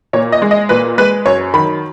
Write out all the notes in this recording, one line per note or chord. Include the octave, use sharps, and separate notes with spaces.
A#2 C#5
D#5
G#3
D#5
A#2 B4
G#3 B4
F#2 C#5
D#3 F#3 B5